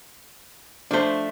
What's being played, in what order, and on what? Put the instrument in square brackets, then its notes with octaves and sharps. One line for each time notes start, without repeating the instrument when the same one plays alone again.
[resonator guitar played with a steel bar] F3 A3 [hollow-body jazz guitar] D4 C5